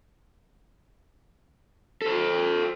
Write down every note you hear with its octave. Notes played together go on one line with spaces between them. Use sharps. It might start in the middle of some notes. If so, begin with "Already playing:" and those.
A4 C5